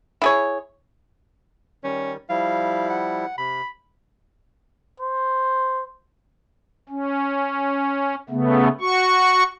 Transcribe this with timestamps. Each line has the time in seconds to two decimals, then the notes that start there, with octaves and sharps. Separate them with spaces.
0.22 E4 G#4 C#5
1.84 D#3 G3 C#4
2.29 F3 G3 E4 F5
2.89 F#5
3.38 C3 B5
5.00 C5
6.89 C#4
8.30 C#3 A3 B3
8.81 F#4 C#6